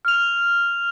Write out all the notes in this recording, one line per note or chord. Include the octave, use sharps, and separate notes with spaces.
F6 F7